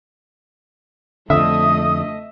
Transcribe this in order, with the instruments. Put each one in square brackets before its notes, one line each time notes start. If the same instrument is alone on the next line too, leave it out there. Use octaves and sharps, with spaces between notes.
[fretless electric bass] F2 D3 [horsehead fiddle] A3 D#5 [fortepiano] E5 [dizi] D#6